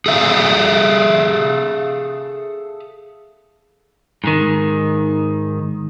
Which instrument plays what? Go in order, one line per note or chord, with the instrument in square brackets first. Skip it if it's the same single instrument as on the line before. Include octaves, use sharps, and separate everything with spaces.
[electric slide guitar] G#4 A4 E5 F5
[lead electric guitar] G#2 D#3